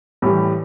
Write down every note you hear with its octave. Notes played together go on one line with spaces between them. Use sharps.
A2 E3 G3 G4